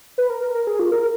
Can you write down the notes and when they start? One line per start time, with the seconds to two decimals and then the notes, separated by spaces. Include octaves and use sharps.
0.18 B4
0.30 A#4
0.42 A#4
0.55 A#4
0.67 G#4
0.80 F4
0.92 A#4